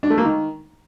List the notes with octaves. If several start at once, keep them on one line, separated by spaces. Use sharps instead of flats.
D4
A3
A#3
D#3